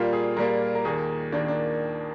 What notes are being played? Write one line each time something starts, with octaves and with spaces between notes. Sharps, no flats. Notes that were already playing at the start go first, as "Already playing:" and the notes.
Already playing: A#2 G3 A#3 F4
G#4
A#2 G3 A#3 A#4
A#4
D#2 D#3 A#3 G#4
D#2 D#3 A#3 D4
D4